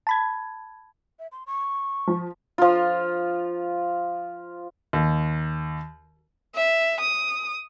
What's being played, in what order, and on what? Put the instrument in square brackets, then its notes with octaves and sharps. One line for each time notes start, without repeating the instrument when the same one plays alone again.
[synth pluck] A5 B5 G#6
[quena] E5
C6
C#6
[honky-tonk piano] F3
[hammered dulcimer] F3 F4
[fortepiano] D#2
[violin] E5
D#6